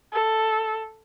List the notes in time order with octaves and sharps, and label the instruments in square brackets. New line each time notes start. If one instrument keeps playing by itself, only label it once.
[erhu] A4